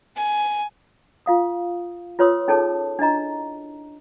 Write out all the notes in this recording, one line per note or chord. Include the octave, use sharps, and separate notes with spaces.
G#5
F4 F5 D#6
F4 B4 C#5 C6 D#6 E6
C#4 D#4 G#4 A4 C#5 A5
D4 E4 D#5 A#5